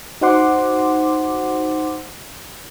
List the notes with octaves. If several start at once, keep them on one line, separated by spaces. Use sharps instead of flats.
D#4 F#4 C5 F#5 C6 D6